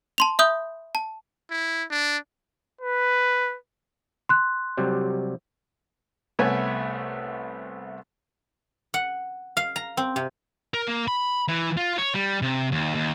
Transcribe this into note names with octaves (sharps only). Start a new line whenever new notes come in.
A5 C6 F7
E5 B5 D#6 G6 G7
A5
E4
D4
B4
C6 F#6
C3 F#3 G3
C2 A3 B3 C#5 E5 G#5
F#5
F5
A#5
C4
C3
A#4
A#3
B5
E3
F4
C#5
G3
C3
D#2
D#2